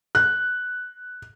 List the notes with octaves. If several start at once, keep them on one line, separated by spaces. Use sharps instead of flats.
F#6